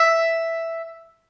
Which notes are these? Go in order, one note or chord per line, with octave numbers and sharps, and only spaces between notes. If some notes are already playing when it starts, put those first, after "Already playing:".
Already playing: E5